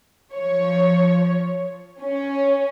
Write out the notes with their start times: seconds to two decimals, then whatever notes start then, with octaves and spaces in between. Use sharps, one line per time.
0.33 F3 C#5
2.00 C#4